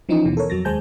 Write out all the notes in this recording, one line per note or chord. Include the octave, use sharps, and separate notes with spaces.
E3 F3 C#4 D#4
D#2 B2 E3
A4 A#4 C#5
F2 F#3 A6 A#6
D#2 G#3 C5 G#5 A5 G6